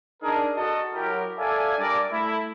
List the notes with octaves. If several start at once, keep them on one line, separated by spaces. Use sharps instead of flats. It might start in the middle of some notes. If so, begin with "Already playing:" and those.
D4 D#4 G#4 A#4
F#4 A4 D#5
F#3 E4 G4 A#4
A4 D5 E5 F5 G#5
G3 D4 A#4 D5
A3 E4